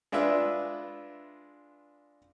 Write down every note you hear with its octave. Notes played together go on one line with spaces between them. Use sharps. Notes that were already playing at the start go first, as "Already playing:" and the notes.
G#3 D4 F4 B4 E5